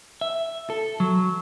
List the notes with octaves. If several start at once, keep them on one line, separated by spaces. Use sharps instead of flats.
E5
A4
F#3